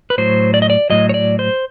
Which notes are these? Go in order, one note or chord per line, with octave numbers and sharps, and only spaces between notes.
B4
A2 F#3 C5
D5
D#5
D5
A2 F#3 D#5
C#5
D5
C5